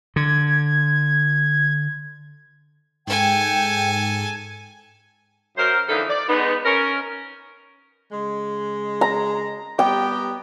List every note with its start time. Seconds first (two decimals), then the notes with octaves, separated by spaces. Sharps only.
0.16 D3 G#6
3.07 G#2 A4 G5 G#5
5.58 F#2 A#4 C5
5.89 D3 E3 F3 A#3 D#4 A4
6.10 D5
6.29 G#3 B3 D#4
6.65 C#4 A#4
8.12 C#3 G#3
9.01 A#5
9.79 G3 B3 G4 G5